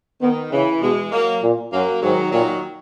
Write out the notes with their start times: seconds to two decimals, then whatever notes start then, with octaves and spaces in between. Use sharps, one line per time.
0.22 D#3 B3
0.52 C#3 E3
0.82 B2 E3 G#3
1.12 F#3 A#3
1.43 A#2
1.72 F#2 F#3 A#3
2.03 G#2 D#3 F#3
2.32 A#2 D#3 F#3